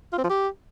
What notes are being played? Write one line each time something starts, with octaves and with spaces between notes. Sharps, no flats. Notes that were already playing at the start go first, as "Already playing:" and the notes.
F4
C4
F3
G4